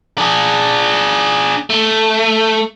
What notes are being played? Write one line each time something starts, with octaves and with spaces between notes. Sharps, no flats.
D4 G#4
A3